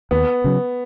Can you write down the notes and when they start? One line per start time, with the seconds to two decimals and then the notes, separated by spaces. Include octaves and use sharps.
0.11 D#2 B3
0.44 C#3 F#3 C#4